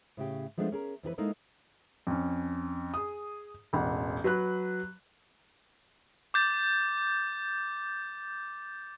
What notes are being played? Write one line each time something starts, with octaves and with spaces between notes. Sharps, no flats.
A2 C#3 G4
F3 G#3 A3 B3 C4 D4
C#4 G#4 A#4
F2 E3 G#4 B4
G#3 A#3 D#4 E4 A4 C5
F2 C#4
G#4 D#6
E1 A1 F#5
F#3 B4 B5 F#6
D6 G6 A6